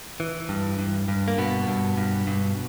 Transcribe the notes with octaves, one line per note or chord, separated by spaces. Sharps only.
E3
G2
G2
G2
A#3
G2 B2 B3
G2
G2
G2